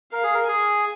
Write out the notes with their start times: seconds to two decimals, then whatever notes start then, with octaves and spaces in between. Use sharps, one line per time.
0.12 A#4 F5
0.23 G#4
0.34 A#4
0.48 G#4 G#5